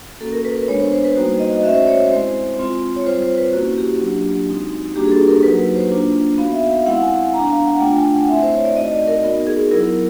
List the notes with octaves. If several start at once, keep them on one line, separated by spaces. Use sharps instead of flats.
A#3 C#4 F#4 A4
A#4
B4
B4
G#3 B3 D4 C#5
C5
C5
B4
G3 A#3 D#4 F#4 C5
D#5
D#5
A3 C#4 F#4 E5
C5
D5
C#5
C5
G#3 C4 E4 C5
G#3 C4 F4
C#5
G3 C4 F4 C5
C5
B4
A#3 C#4 E4 F#4
G4
F#3 A#3 D4 F4
G#3 C4 D#4 F#4
G3 A#3 D4 F#4 G4
G#4
A4
A#4
F#3 A#3 D#4 F#4 B4
B4
C5
A#3 D4 F4
B3 D#4 F#4 F5
E5
F5
F5
G#3 C4 E4 F#5
G#5
G#3 B3 D4 A#5
F5
F#5
A3 D4 F4 G5
G#5
F#5
A3 C4 E4 E5
C5
C#5
D5
A3 C4 D#4 F#4 D#5
D5
A#4
B3 D#4 F#4 A#4
G#4
F#3 B3 E4 A#4